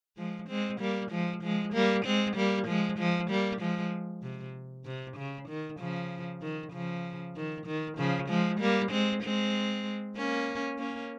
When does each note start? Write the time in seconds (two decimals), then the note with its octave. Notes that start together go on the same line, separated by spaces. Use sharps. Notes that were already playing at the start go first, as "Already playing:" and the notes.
0.17 F3 G#3
0.49 G#3 C4
0.80 G3 A#3
1.11 F3 G#3
1.43 F3 G#3
1.73 G3 A#3
2.05 G#3 C4
2.36 G3 A#3
2.67 F3 G#3
2.98 F3 G#3
3.30 G3 A#3
3.60 F3 G#3
4.23 C3
4.85 C3
5.17 C#3
5.48 D#3
5.79 C#3 F3
6.42 D#3
6.72 C#3 F3
7.36 D#3
7.66 D#3
7.98 C#3 F3
8.29 F3 G#3
8.60 G3 A#3
8.91 G#3 C4
9.23 G#3 C4
10.17 A#3 C#4
10.78 A#3 C#4